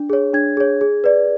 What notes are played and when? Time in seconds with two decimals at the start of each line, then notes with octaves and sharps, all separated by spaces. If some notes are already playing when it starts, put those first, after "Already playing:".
Already playing: D4
0.10 G#4 C#5
0.34 D4 G#6
0.57 G#4 C#5
0.81 G#4
1.04 B4 D5